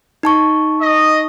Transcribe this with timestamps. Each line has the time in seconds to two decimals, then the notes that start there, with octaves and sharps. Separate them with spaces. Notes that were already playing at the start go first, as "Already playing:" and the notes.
0.23 D#4 A5 C#6
0.81 D#5